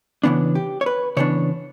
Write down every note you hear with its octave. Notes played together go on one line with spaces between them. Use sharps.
C#3 E3 B3 D4
G4
C#5
B4
C#3 E3 B3 D4 C#5